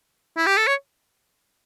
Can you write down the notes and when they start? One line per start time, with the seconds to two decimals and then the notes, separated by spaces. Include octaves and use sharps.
0.37 E4
0.47 G4
0.57 A4
0.67 C#5